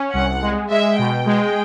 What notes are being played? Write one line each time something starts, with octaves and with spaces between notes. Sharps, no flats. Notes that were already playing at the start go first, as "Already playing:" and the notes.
Already playing: C#4
C2 F#5
G#3
G#3 E5
B2 G5
G#3